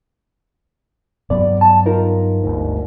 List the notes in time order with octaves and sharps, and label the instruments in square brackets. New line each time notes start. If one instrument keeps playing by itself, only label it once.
[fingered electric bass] G2 F#3 B3 [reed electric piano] D5
[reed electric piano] A5
D#4 F4 A#4
[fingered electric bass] G1 D2 G#2